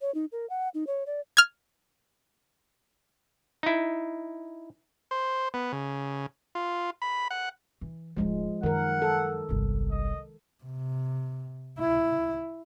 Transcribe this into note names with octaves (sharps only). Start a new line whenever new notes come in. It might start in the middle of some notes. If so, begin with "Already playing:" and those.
C#5
D#4
A#4
F#5
D#4
C#5
D5
F6 G#6
D#4 E4
C5
B3
C#3
F4
B5
F#5
E3
D1 F3 G#3 D#4
F#2 D#3 A#4 F#5
A4
G1 C2
D#5
C3
E4